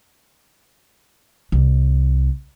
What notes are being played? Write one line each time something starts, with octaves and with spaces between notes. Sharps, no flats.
C2